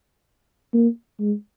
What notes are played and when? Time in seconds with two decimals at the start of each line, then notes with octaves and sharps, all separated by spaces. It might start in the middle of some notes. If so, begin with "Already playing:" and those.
0.74 A#3
1.19 G#3